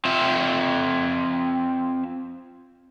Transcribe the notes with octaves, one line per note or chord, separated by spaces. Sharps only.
C4 F4 E5